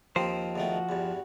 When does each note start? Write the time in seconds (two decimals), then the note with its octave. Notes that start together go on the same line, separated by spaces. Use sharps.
0.16 D#2 D#3 F3 C4 C5
0.56 E2 D#3 A3 F#4
0.89 E2 G2